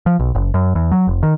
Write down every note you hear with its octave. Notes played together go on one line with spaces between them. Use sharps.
F3
B1
F#1
F#2
E2
F#3
F1
D#3